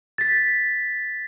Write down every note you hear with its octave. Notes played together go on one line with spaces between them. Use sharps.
A6 B6